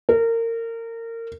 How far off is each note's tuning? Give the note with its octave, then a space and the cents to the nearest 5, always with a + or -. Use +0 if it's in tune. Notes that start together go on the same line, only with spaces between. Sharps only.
A#4 -25